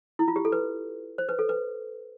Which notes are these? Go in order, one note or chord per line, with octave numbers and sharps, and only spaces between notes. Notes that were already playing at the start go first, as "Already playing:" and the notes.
E4
F4
G4
A4
B4
C5
B4
A4
B4